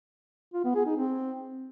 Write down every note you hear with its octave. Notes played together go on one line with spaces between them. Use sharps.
F4
B3
G#4
D#4
C4